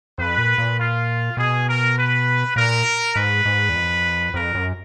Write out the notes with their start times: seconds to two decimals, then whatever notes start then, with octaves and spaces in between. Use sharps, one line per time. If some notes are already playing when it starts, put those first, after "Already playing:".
0.18 F2 B4
0.38 A#2
0.58 A#2
0.78 F4
1.37 B2 G#4
1.68 A#4
1.97 B4
2.56 A#2 A#4
3.15 G#2 B4
3.45 G#2
3.69 E2
3.76 F2
4.34 F2 A#4
4.55 F#2